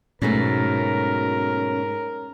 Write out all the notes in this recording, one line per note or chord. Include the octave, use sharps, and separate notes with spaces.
G#2 B2 F#3 A3 C#4 A#4